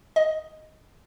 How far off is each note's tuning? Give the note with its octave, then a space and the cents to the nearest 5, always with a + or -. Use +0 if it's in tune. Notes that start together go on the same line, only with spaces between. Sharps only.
D#5 +5